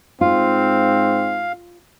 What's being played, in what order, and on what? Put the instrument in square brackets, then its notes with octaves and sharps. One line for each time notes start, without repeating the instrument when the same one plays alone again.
[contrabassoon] G#2 [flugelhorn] C4 [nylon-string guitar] F4 [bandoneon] F5